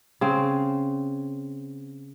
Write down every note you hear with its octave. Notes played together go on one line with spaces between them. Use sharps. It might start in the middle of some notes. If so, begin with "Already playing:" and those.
C#3 C4